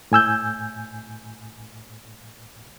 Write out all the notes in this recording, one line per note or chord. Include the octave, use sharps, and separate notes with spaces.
A2 G#5 E6 G6